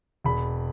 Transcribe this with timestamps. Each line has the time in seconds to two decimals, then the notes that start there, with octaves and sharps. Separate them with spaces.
0.24 E1 B5